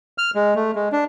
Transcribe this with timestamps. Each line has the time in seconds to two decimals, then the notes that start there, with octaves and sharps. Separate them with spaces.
0.18 F6
0.35 G#3
0.55 A3
0.76 G#3
0.92 D4